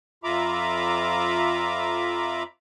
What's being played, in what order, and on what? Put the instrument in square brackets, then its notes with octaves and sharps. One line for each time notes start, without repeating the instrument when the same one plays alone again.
[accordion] F2 F4 E5 A#5 B5 D6